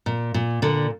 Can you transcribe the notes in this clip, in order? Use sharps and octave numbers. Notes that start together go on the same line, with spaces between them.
A#2
A#2
A#2 D3